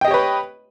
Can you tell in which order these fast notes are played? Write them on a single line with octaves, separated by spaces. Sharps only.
G5 D#5 G4 C#5 B4